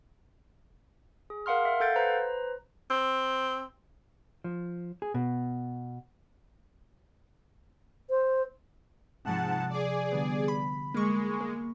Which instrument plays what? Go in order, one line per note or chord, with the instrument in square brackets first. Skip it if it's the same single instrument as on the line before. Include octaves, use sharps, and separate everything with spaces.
[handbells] G#4
A#4 F5 F#5 C6 F6
E5
A4 F5 F#5 G6 A6 D7
B4 C5 A#5
[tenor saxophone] C4
[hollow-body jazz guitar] F3
G#4
B2
[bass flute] C5
[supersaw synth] G#2 F#5 A5 [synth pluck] C3 F3
[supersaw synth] G#4 D5
[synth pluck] D3 G3 B3
B5
[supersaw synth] G#3 [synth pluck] A#3 C#6
[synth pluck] A#3